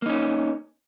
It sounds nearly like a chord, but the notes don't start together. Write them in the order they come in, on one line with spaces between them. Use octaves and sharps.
A#3 D#4 C#4